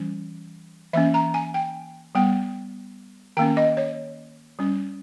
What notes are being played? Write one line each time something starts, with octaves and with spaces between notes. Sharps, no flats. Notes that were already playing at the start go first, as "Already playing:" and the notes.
Already playing: E3 G3 C#4
E3 A#3 C#4 E5
A#5
G#5
G5
G3 B3 G5
D#3 A#3 C#4 G5
D#5
C#5
G3 C#4